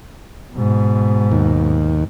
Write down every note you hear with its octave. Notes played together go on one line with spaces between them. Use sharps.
G#2 B2
D#2